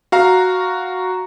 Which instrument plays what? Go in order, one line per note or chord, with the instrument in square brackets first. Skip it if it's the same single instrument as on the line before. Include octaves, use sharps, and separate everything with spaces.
[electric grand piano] F#4 F5 A#5